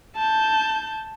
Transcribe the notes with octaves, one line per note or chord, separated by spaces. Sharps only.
A5 G6